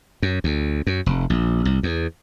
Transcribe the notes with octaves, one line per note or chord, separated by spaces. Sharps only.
F#2
D2
F#2
F1
A#1
C2
E2